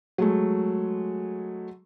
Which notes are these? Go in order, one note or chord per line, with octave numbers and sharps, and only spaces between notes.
F#3 G#3 A3